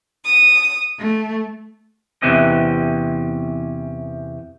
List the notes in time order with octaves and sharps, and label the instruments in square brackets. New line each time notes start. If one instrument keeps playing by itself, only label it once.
[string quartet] D#6
A3
[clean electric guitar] E2 C3 E3 C4 C#4 D#5